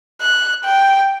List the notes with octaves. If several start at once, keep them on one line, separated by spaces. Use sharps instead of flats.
F#6
G5